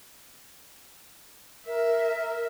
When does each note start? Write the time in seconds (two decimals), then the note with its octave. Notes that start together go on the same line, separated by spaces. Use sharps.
1.67 A#4 E5